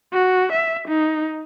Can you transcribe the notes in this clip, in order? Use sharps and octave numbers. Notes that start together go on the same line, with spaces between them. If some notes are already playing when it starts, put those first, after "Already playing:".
F#4
E5
D#4